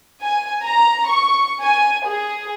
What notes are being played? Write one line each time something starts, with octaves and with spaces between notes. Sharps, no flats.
G#5
A#5
C#6
G#5
G#4